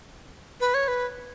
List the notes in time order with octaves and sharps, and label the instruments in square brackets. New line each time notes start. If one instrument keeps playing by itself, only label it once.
[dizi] B4
C#5
B4